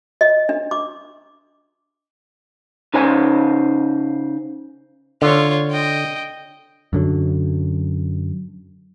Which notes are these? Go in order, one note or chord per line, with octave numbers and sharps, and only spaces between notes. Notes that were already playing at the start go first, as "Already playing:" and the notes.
D#5
D4
D6
C#3 D#4 C5 G#5
D3 F4 C#5
D#5 G5
F#2 D3 F#3